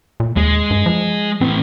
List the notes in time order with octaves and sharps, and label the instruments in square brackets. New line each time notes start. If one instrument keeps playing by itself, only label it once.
[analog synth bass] A#2
[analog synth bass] D#2 [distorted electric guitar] G#3
[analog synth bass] G2
F3
[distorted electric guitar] A2 E3 [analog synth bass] C4